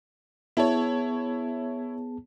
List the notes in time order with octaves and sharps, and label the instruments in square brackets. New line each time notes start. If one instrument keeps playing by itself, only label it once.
[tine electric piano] B3 G#4 A5 [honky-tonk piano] E4 C#5